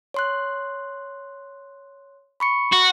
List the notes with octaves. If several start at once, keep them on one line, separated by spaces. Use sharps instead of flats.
C#5 C6 F#6
B5 C#6 C#7
F#4